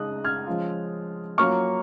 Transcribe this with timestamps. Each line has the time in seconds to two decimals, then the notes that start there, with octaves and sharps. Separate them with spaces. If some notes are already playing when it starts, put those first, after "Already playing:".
Already playing: C#3 G#3 D#4 D#6 F#6
0.24 F6 G#6
0.47 F3 G#3 C#4 F4
1.38 F#3 A#3 C#4 F4 C#6 F6